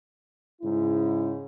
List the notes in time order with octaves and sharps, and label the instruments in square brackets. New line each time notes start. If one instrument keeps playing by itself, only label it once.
[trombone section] G#2 C#3 E4